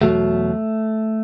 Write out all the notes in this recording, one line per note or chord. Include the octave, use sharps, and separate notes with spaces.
E2 B2 F#3 A3